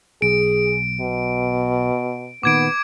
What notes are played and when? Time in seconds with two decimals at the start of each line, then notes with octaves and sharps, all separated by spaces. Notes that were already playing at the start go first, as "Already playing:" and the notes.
0.22 B1 G#4 D7
1.01 B2
2.43 A#2 D#3 B3 D6 G#6 D7